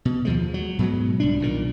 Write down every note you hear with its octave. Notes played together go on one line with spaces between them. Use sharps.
B2
D#2 F3 G#3
F#3
G#2 B2 F#3
C2 G3 D4
B1 A#2 D#3